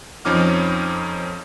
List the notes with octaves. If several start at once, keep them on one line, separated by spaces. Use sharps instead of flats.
F2 F3 C#4 D#4 D6 F6